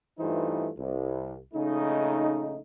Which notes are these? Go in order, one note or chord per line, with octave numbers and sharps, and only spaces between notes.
G2 E3 A3 D#4 F4 C5
C2
A#1 C#3 A3 D#4